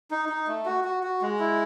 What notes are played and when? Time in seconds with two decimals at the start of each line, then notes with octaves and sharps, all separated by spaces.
0.11 D#4
0.29 D#4
0.48 A3
0.66 F#4
0.84 F#4
1.03 F#4
1.22 G#3
1.40 E4